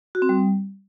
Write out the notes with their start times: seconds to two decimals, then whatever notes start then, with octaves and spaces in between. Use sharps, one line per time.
0.15 F#4
0.22 C4
0.29 G3